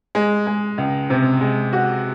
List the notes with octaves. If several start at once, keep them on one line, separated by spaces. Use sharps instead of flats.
G#3
G#3
C#2
C3
G#3
F#4